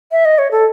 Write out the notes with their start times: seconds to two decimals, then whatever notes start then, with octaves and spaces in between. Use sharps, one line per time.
0.12 E5
0.25 D#5
0.38 C#5
0.51 A4